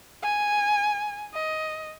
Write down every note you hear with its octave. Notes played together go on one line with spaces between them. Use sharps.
G#5
D#5